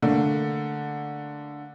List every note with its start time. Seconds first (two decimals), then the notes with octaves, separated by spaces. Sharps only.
0.02 D3 A3 A#3